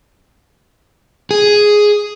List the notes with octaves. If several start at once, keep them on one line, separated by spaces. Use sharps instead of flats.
G#4